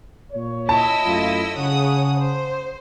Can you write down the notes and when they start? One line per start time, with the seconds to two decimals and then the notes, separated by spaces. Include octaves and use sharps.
0.33 A#2 C#5
0.69 E4 D#5 A5 E6
1.05 F#2 A3 F4
1.56 C#3 C#5 F#5 D#6
2.18 C5